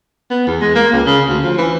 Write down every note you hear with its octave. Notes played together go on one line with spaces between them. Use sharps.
B3
E2
G#3
A#3
C#2
C#3
D2
F3
E3